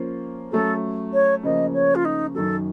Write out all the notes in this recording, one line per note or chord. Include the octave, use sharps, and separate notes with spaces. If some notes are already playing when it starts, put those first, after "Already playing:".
Already playing: F3 A#3 C#4 F4 C5
F#3 A3 C#4 A4
C#5
C#3 F3 A#3 D#5
C#5
F4
D#4
F#2 D#3 F#3 A4